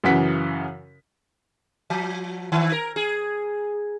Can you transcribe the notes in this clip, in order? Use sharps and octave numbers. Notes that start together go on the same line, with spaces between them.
F#2 C#3 E3 F#5 B6
F3
D#3
A#4
G#4